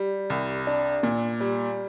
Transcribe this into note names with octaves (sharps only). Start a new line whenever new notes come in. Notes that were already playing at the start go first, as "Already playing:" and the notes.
Already playing: G3
C2
D4
A#2
G3